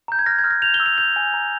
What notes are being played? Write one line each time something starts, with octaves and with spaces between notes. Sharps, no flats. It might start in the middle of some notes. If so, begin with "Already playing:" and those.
A#5 G6
G#6
F6 A#6
G#6
F6
A#6
G6 F7
G7
E6
F7
G6 F7
G#5
A#5